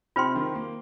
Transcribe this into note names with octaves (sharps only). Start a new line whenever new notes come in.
C3 F4 C5 G5 C6
D#3
A#3